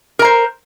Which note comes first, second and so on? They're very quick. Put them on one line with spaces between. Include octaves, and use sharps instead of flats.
A#4 A#5 C5